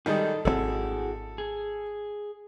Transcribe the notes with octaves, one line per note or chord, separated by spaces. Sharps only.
D#3 G3 G#3 D#4 A4
G#1 D3 C4 E4 F#4 G#4 A4
G#4